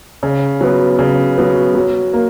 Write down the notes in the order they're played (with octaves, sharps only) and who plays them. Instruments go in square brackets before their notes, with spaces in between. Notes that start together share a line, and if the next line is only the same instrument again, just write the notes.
[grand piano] C#3
F#3 B3
C#3
F#3 B3
F#3
A#3